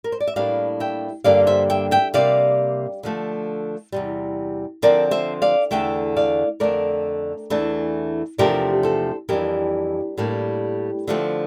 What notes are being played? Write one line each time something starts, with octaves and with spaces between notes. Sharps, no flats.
A#4
C5
D5
E5
A2 G3 A#3 D4 D5 F5
E5 G5
G2 D3 G3 A#3 D5 F5
C5 E5
E5 G5
E5 G5
C3 G3 A#3 D5 F5
D3 F3 A3
E2 C3 G3
D3 F3 C4 A#4 D5
C5 E5
D5 F5
E2 D3 A3 E5 G5
D5 F5
F2 D3 A3 A#4 D5
E2 E3 A3 D4
E2 C3 F3 A3 D4 G4 A#4
A4 C5
F2 E3 G3 D4 G4 A#4
A2 G3 A#3 D4
D3 F3 A3 C4